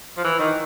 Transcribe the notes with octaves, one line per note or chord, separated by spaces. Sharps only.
F3
E3
D#3